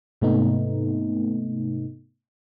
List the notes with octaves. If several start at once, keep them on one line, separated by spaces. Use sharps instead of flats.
G#2 C3 A3 B3 D#4